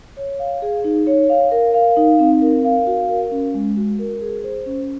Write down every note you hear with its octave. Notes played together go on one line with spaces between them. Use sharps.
C#5
F5
G#4
D#4
C#5
F5
A#4
F5
D#4
C4
A#4
F5
F#4
A#4
C#4
G#3
F#4
A#4
G#4
C5
C#4